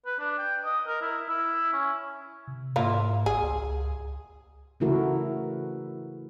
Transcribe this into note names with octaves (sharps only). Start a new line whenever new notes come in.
B4
D4
G5
D#5
A#4
E4
E4
C#4
C3
G#2 A#3 E4 F4
G#1 G#4
C#2
C#3 E3 A3 E4 F#4 A#4